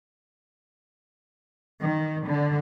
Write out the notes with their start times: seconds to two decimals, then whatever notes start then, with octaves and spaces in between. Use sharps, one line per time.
1.81 D#3
2.26 D3